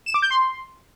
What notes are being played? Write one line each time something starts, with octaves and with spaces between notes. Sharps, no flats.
E7
D6
G6
C6